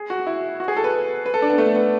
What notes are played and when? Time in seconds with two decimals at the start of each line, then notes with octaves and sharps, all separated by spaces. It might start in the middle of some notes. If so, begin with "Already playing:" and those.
Already playing: G#4
0.10 F#4
0.27 E4
0.60 F#4
0.68 G#4
0.77 A4
0.84 B4
1.26 B4
1.34 A4
1.42 D4
1.50 B3
1.58 A3
1.75 B3